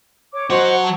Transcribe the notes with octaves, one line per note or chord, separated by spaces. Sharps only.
C#5 D6
F#3 F#4 C5 D#5 F#5
A5